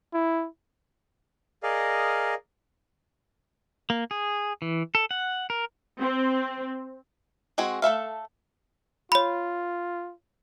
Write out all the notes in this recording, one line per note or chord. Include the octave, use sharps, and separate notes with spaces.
E4
G#4 A#4 D5 D#5 F5
A#3
G#4
E3
A4
F#5
A#4
C4
G#3 C4 F#4 G#4
A3 A4 E5 F5
F4 C#5 B5